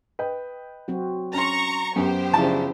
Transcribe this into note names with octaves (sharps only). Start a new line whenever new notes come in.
B4 D#5 G5
F#3 C4 F#4
C#4 A#5 C6 C#6
F#2 B3 G4 C5
C#3 F3 D4 E4 A5